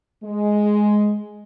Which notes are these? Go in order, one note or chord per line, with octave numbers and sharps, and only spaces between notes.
G#3